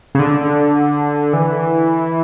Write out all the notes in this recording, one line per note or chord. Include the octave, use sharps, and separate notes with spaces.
C#3
D3
E3